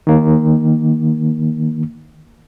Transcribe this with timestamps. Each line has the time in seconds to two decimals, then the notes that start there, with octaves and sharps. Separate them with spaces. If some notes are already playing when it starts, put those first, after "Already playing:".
0.07 D#3 A#3